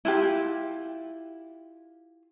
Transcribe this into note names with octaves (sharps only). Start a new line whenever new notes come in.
E4 F4 G4